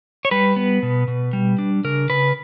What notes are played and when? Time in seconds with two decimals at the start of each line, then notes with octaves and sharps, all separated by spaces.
0.25 C#5
0.31 G3 B4
0.56 B3
0.83 B2
1.08 B2
1.33 G3
1.58 D4
1.84 C#3 A#4
2.10 C#3 B4